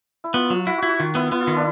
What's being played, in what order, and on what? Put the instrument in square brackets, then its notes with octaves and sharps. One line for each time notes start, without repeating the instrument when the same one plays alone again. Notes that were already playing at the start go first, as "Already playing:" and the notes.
[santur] E4
[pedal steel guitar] B3 [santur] F4
[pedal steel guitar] F#3 [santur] F4
[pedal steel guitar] E4 [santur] F4
[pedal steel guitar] E4 [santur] F#4
[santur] F#4
[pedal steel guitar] D#3 [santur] F4
[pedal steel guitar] B3 [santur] E4
[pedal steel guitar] B3 [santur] E4
[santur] F4
[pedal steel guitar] D#3 [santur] E4
[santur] D4